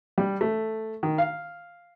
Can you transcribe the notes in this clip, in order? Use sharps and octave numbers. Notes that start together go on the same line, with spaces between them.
G3
A3
D#3
F5